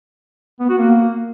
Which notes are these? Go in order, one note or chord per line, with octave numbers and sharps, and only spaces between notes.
B3
F#4
A#3